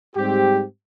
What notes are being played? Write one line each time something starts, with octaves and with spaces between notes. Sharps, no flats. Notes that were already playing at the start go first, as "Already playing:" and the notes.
G#2 G3 C4 G4